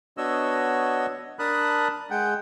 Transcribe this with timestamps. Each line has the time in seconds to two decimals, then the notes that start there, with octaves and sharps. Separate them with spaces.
0.18 B3 D4 F#4 C#5 D#5 E6
1.39 D4 A#4 A5 B5 D#6 F#6
2.11 G#3 F#5 G5